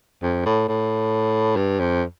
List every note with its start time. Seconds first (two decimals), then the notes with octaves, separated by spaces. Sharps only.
0.22 F2
0.46 A2
0.68 A2
1.56 G2
1.79 F2